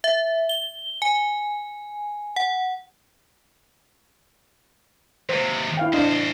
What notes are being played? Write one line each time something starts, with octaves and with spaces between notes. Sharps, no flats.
E5
G7
G#5
F#5
D#2 C3 C5
E4 F5 G5
E2 D4 C5 D#5 F5